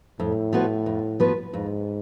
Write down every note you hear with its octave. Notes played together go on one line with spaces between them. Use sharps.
F2 A2
F3 B3 F#4 B4
F2
F3 B3 F#4 B4
F2 G#2